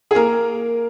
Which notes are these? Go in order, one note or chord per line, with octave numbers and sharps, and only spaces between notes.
G#4
A#3 A#4